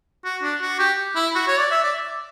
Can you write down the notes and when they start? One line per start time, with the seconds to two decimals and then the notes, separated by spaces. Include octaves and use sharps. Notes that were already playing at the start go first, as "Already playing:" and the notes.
0.25 F#4
0.43 D4
0.61 F#4
0.79 G4
1.16 E4
1.35 F#4
1.48 C#5
1.59 D5
1.71 E5
1.84 D5